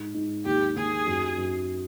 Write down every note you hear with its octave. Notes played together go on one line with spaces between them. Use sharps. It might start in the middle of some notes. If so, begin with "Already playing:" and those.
Already playing: G#2
G#2
D#2 G4
D#2 G#4
F#2
F#2